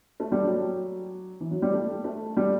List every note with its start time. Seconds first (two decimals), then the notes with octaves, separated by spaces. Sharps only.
0.20 A3
0.32 G3
0.44 F#3
1.40 E3
1.51 F#3
1.62 G3
1.73 A3
2.04 A3
2.37 G3